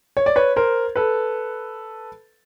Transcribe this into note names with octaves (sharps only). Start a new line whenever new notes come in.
C#5
D5
B4 C#5
A#4 C5
A4 B4